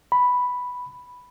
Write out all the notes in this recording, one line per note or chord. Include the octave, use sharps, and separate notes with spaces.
B5